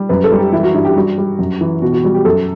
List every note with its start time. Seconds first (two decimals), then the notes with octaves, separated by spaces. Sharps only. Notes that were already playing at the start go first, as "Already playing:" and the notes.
Already playing: G3
0.09 F#2 B4
0.24 A4
0.32 G3
0.39 G4
0.52 E3 E4
0.63 F#4
0.74 G2 E4
0.85 G4
0.96 G3 F#4
1.18 G3
1.39 F#2
1.61 E3
1.82 B2 F#4
1.93 F#4
2.03 G3 F#4
2.14 G4
2.25 F#2 A4